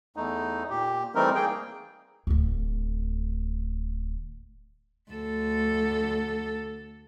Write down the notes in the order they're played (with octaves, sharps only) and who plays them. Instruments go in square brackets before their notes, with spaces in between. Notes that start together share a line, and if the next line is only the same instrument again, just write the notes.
[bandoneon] E2 A3 D#4
A#2 G4
E3 G3 A3 C4 D#4 A#4
A#3 G#4 G5
[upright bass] D1 D2
[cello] D2 A4